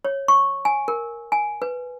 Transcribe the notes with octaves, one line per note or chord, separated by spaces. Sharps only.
C#5
C#6
G#5
A#4
G#5
B4